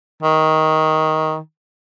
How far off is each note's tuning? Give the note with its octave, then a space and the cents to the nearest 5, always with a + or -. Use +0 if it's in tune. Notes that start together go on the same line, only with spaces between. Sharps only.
D#3 +15